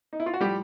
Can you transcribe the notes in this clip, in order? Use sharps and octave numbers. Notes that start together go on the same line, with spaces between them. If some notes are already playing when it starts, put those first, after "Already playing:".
D#4
E4
F4
F#4
A2 F3 G3 G4